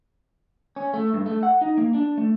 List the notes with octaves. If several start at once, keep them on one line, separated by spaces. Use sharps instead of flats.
C#4
A3
G2
A3
F#5
D#4
A#3
D4
A3